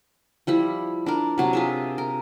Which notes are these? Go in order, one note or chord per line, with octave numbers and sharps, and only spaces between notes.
F3 G3 E4
D4 A#4
C3 F#3 A#4
F4 G#4 E5
A#4